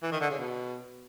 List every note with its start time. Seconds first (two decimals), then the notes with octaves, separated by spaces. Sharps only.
0.03 E3
0.12 D#3
0.21 D3
0.30 C#3
0.39 B2